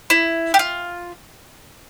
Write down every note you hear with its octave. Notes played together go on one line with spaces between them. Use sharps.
E4
G4
F4